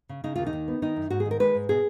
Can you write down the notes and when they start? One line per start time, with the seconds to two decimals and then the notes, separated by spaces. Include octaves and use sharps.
0.09 C#3
0.24 C#3 D#4
0.35 D#2 F4
0.46 D#4
0.53 D#3
0.68 B3
0.82 D#3 D#4
0.96 F#2
1.10 G#2 F#4
1.20 G#4
1.25 D#3
1.31 A#4
1.40 G#3 B4
1.54 G#2
1.69 B2 G#4